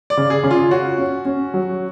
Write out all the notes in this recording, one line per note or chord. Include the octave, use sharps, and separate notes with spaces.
D5
C#3
G#4
C#3
F4
F#4 C#5
C#4
C#4
F#3